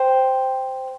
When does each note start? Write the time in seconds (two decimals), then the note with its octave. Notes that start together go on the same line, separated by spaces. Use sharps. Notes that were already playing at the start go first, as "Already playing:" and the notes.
Already playing: C5 G5